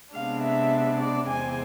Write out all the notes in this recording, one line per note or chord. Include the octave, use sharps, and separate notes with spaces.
C3 G#3 B3 D4 F5
E5
D5
E2 C3 G#3 C4 G#5